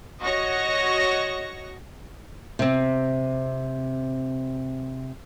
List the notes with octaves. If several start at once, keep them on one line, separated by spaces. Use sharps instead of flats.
F#4 C#5 D#5 C#6 A#6 C#7
C3 C4